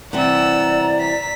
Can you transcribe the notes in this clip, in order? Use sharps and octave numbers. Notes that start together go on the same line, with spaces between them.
C3 E3 G3 D5 F#5 A#5 E6
B6